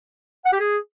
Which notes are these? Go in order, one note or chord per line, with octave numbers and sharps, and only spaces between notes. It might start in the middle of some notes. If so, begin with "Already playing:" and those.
F#5
G4
G#4